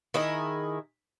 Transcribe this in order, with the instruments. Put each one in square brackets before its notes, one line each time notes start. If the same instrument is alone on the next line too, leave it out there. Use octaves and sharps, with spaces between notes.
[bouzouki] D#3 E4 G#4 D#5